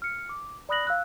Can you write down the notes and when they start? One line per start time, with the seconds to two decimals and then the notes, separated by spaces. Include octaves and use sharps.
0.02 F6 C#7
0.29 D6
0.69 D5 B5 D#6 F#6 A#6 F#7
0.87 F5 E6 F#6